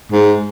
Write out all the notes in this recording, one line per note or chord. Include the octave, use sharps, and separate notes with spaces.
G#2